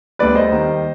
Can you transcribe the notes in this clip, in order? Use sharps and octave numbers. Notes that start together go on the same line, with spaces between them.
D2 D3 G3 B4 D5
C5 D#5
D#2 D#3 G3